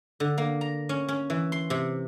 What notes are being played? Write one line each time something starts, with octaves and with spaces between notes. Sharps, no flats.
D3
A#3
A#5
C#4
C#4
E3
C6
C3